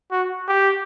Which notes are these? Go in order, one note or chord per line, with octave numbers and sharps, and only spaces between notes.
F#4
G4